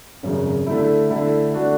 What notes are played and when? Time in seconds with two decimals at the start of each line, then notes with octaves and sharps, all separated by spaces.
0.23 G#1 F#2 C#3
0.66 D3 A3 E4
1.10 D3 A3 E4
1.54 D3 A3 D4 F#4